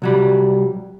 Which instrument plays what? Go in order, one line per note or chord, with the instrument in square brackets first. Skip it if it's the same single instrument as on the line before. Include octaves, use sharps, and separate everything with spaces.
[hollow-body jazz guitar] C2 F#3 G3